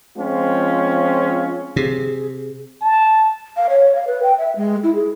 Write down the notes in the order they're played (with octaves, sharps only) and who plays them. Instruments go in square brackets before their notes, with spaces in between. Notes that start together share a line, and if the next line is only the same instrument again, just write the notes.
[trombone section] F3 G#3 C4 C#4 F4
[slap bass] C3 [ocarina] G#4
[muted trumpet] A5
[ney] F5
C#5
F5
B4
G5
E5
G#3
E4
G#4